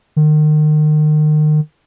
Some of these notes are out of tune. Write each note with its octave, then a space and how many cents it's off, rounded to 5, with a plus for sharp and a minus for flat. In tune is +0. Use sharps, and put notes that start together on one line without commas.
D#3 -35